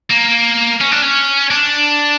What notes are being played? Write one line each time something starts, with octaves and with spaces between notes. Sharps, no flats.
A#3
C#4
D4
C#4
D4